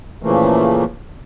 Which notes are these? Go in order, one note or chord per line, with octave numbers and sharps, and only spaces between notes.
A#2 C#3 E3 F3 A3 A#3